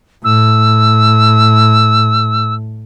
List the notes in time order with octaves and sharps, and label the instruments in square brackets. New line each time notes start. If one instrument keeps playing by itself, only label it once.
[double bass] A2 [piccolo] E6